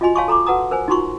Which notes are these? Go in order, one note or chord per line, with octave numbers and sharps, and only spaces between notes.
F4 F#4 D#5 G#5 B5 C6
C#5 F5 G#5 A5 C6 C#6
A4 A#5 C6 D6
F#4 B4 F#5 A5 A#5 D#6
A#4 C5 G#5
D#4 F4 F#4 A#5 C6 C#6